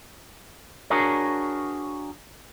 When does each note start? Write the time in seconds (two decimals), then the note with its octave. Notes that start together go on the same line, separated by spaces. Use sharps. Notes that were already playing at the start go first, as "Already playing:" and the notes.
0.90 D4 F#4 G#4 A#4 C#5